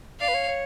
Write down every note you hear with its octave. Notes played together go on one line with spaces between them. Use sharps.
D5 F5
B4
C#5
C#5